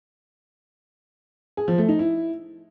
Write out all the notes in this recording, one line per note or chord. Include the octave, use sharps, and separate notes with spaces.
G#4
F3
A3
D#4
E4